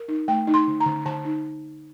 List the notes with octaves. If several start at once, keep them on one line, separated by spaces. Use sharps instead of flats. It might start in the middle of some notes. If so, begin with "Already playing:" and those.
Already playing: A#4
D#4
A3 G5
D#4
C6
D3
A#5
D3
D3 A5
D#4